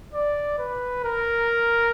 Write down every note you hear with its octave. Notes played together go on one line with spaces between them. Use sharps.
D5
B4
A#4